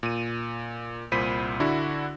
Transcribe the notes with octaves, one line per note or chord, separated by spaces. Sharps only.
A#2 D#7
C2 A#2 C5 B5 B6 D#7
D3 D4 E4 F#4